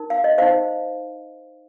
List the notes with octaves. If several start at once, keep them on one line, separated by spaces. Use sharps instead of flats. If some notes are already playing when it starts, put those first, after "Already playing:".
Already playing: D#4 A#4
F5
D#5
D#4 C5 F5